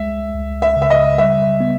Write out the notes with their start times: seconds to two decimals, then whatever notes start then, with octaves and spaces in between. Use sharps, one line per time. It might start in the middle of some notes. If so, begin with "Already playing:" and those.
Already playing: C#2 G#3 E5
0.35 C#2
0.62 E5
0.76 C#3
0.82 E5
0.90 D#5
1.18 G3 E5
1.60 B3